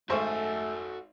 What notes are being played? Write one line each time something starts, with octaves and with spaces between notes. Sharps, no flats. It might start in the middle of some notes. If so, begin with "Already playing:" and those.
G#1 A3 F#4 A4 C5 G#5 C#6